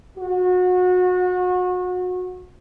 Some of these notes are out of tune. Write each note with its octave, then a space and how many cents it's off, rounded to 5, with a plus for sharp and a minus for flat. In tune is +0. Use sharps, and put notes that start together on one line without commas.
F#4 -30